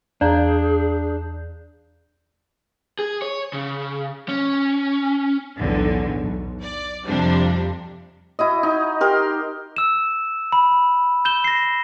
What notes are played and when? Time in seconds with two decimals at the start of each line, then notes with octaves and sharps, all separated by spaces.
0.21 E2 D4 G#4 D5 F5 A#5 G6
2.99 G#4
3.22 C#5
3.53 C#3
4.29 C#4
5.56 B1 E2 A2 D3
6.20 B1
6.61 D5
7.06 F2 C3 F3 G3 D4
8.39 E4 F#4 D#5
8.63 D#4
9.01 G4 A#4 C6
9.76 E6 E7
10.52 B5
11.25 G6 E7 G7
11.44 A#6 C7